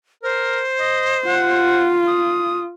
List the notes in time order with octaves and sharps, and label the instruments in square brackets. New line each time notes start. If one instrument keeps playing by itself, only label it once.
[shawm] A#4 [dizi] C5
[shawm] D#5
[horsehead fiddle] F4 [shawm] F#5
[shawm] D#6